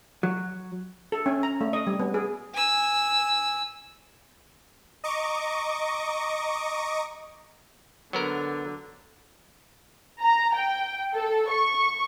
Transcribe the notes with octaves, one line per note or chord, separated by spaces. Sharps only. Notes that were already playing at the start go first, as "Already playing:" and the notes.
F#3
A4
C#4
A#5
A3
D#5
G3
B3
G#4
G#5 E6
D#5 A#5 C#6 D6
D3 F#3 B3 A#4
A#5
G5
A4
C#6